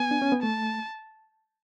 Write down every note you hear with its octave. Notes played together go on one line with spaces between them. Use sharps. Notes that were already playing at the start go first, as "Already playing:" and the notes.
Already playing: B3 G#5
D4
C#4
B3
A3 A5